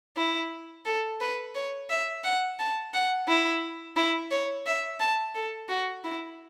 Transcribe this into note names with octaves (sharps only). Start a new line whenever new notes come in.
E4
A4
B4
C#5
E5
F#5
A5
F#5
E4
E4
C#5
E5
A5
A4
F#4
E4